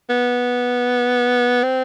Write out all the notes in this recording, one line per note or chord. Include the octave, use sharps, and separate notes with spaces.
B3
C4